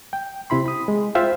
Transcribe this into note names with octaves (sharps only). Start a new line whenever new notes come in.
G5
C3 E4 B5 C6
B5 D#6
G#3
F4 C5 E5 F5 G5